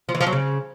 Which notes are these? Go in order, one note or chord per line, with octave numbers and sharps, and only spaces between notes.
F3
E3
F3
F#3
C#3